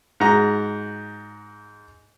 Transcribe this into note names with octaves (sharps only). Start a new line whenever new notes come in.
G#2 F#4 A#5